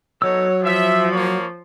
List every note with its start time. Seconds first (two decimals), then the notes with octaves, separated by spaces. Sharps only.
0.22 F#3 B3 D#4 A4 C#5 E6
0.64 F3 E5
1.12 A#3 C#5